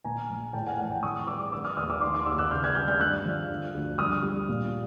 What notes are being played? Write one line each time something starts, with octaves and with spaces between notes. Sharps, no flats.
A#2 G#5 A#5
A#1
A2 G5 A5
F#5 G#5
A1 F#5 G#5
G5 A5
F2 C#6 D#6
G3 D6 E6
D3 D6 E6
D#6 F6
D#2 D#6 F6
D6 E6
D#3 C6 D6
C6 D6
D#2 D6 E6
E6 F#6
C#3 F6 G6
F#6 G#6
G3 F6 G6
F6 G6
G2 E6 F#6
F3
D3
D2
G2 D#6 F6
G3
A#2